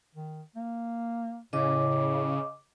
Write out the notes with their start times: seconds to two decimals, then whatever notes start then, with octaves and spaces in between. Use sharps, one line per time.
0.15 D#3
0.55 A#3
1.53 A2 C#3 D#5 D6